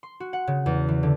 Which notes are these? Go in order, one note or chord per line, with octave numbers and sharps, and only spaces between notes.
C6
F#4
F#5
C#3
E2
E3
D3